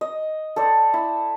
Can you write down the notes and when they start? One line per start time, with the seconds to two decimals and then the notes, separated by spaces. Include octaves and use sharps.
0.01 D#5
0.56 A4 C5 D5
0.94 E4